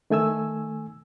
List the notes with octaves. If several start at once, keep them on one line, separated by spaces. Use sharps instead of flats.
D#3 A3 G#5 E6